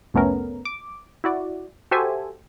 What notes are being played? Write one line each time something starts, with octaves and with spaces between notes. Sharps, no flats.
C2 F2 A3 B3 C#4 A#4
D6
E4 F#4 D5
F#4 G4 A4 C5 E5 G#5